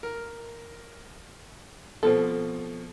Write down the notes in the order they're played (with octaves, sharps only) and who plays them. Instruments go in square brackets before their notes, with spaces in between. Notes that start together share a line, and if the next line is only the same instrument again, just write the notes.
[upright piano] A#4
[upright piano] B2 F3 C4 [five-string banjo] A4